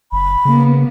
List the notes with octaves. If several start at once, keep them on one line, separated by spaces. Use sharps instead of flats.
F#1 B5
C#3 A#3 B3